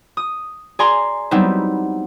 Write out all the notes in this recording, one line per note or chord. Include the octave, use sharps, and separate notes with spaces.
D#6
G#4 D5 G#5 A#5 C6
F#3 G3 B3 C4 D#4 E4